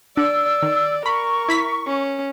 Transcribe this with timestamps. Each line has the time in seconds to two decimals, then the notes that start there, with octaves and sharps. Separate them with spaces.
0.17 D4 D5 E6
0.62 D#3 D5
1.06 A#4 B5 C#6
1.48 E4 B5 B6
1.87 C#4